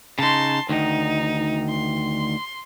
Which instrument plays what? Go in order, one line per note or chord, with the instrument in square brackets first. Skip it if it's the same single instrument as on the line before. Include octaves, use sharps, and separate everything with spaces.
[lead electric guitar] C#3 D#4 [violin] A5 C6
[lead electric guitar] D2 D#3 [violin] D#4
[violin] C6